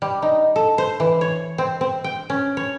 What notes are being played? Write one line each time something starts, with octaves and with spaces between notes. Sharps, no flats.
G3
D#4
A4
C5
E3
C#5
C4
C4
G5
C#4
C#5